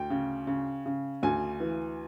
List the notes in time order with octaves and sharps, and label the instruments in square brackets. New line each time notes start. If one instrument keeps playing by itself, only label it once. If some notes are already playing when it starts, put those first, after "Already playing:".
Already playing: [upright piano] D2 G5
C#3
C#3
C#3
D2 G#5
E3